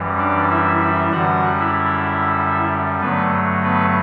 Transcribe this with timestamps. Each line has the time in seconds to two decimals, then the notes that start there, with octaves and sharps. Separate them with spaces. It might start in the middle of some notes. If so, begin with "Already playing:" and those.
Already playing: F#2 E3 G3
0.18 D4 D5
0.49 E4 E5
0.81 E4 E5
1.12 F#2 D3 G3 F#4 F#5
1.59 E4 E5
3.00 G2 D3 F#3 A3 B3 B4
3.64 B3 B4